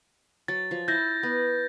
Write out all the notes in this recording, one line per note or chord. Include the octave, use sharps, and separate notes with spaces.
F#3 A6
F3
E4 E5 G6 A#6
B3